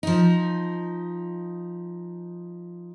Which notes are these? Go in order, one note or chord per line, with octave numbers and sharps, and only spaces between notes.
F3 D#4